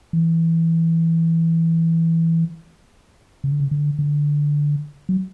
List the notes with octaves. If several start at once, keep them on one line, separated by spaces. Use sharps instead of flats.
E3
C#3
D3
C#3
D3
D3
F#3